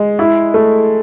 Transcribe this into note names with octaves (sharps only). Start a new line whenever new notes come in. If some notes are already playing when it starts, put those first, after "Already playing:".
Already playing: G#3
E4
A3